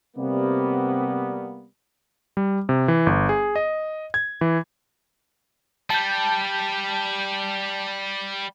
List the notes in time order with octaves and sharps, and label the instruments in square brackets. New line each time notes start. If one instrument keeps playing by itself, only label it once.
[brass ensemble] C3 G3 A#3 B3
[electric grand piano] G3
C3
E3
G1
G#4
D#5
G#6
E3
[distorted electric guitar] G3 [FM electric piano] A5 G6